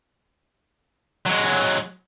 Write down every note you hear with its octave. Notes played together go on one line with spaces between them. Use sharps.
F#3 G#3